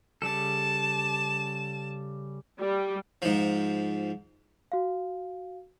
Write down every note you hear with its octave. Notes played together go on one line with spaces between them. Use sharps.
C#3 G3 A4 A5 E7
G3
G#2 F3
F#4 F5